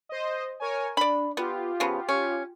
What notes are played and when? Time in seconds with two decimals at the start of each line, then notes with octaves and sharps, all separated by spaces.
0.09 C5 D#5
0.60 A#4 C#5 G#5
0.97 D4 D5 B5
1.37 B3 F4 G4
1.80 C#3 F3 B3
2.09 C#4